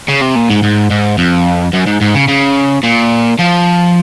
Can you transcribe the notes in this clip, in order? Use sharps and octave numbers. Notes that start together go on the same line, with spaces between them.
C#3
C3
A#2
G#2
G#2
G#2
F2
F#2
G#2
G#2
C#3
C#3
A#2
F3